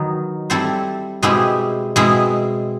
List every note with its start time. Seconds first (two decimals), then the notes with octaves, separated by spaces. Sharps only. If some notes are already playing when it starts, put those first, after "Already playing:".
Already playing: D#3 F#3 B3 D#4
0.50 G3 C4 E4 A4 C5
1.23 B2 G#3 C4 E4 G4
1.96 B2 G#3 C4 E4